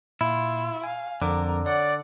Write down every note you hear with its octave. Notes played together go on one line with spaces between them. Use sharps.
A#2 E4 F4
F5 G#5
F2 D3 C4 A#4 D6
C#5 D5 F#5